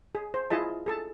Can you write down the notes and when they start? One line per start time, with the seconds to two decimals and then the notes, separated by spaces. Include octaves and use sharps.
0.15 G#4
0.34 C5
0.50 E4 F4 G#4 D#5 A5
0.86 G#4 A4 A5